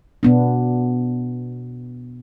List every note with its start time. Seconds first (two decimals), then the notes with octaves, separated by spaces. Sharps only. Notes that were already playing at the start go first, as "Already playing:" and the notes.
0.23 B2 B3 D4